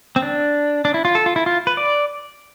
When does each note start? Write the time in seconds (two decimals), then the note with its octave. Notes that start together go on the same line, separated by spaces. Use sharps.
0.16 C4
0.22 D4
0.85 D4
0.94 E4
1.05 F4
1.15 A4
1.26 F4
1.36 E4
1.46 F4
1.67 B4
1.77 D5